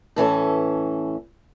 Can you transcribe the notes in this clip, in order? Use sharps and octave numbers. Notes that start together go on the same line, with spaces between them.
A2 E3 C#4 A4